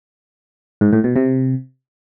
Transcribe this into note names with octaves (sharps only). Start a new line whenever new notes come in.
G#2
A2
B2
C3